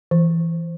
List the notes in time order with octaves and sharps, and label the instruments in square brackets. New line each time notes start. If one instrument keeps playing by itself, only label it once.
[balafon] E3